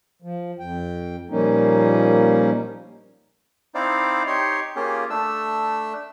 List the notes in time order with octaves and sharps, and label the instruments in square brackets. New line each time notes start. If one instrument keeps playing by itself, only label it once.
[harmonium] F3
F2 G5
A#2 F3 G3 A#3 C#4 D#4
[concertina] C4 D#4 E4 C5 D5 F5
D#4 G4 C#5 C6
A#3 C#4 F4 G4 G#4
A3 D4 E6